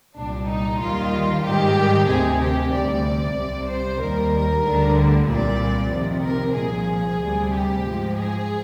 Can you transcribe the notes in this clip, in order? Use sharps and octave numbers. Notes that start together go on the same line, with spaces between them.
C2 A#2 G3 D4
D#4
D#2 D#3 G3 F4
G#2 D#3 G3 G4
D2 C3 D#3 G#4
G4
D2 C3 G3 D5
C2 C3 G3
C5
D#2 D#3 G3 A#4
D2 D3 G3
C2 A#2 G3 D5
F2 C3 D#3
A#4
C2 A#2 F3 G#4
D2 C3 G3
G4
G#2 F3
G#4